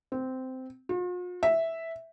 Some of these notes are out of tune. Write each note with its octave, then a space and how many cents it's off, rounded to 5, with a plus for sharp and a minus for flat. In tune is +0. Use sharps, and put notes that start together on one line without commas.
C4 -15
F4 +45
E5 -5